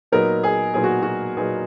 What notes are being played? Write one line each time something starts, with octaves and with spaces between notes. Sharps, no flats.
A#2 F#3 B3 D#4 A#4
G#4
A#2 F#3 B3 D#4 G#4
F#4
F#4
A#2 F#3 B3 D#4 G#4